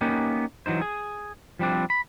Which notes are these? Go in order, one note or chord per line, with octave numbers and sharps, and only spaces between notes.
A#3 B3 C#4 D#4 G4
E3 F#3 D#4 C5
G#4
F3 G3 C4 D4
B5